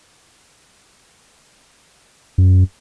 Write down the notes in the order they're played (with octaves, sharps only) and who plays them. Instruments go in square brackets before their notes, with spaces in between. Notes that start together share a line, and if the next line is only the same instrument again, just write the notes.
[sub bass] F#2